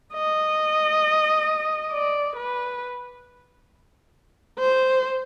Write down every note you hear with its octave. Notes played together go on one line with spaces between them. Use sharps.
D#5
D5
B4
C5